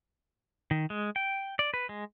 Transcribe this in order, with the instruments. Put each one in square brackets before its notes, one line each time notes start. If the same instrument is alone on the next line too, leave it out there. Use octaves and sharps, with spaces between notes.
[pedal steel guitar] D#3
G#3
G5
D5
B4
G#3